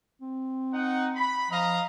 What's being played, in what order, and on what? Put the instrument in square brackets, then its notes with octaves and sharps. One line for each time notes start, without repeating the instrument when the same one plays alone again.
[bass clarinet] C4
[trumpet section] D#4 F#5
B5
[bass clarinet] F3 [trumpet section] D#5 F5 A#5